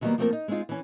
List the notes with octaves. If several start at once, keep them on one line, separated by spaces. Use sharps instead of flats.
D3 D#3 F#3 G3 A#3 B3
F3 A3 A#3 C4 F4 A#4
D#4
G#3 C4 C#4 D#4 F4
E3 C#4